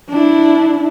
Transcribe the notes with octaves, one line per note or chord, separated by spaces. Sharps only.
D4 E4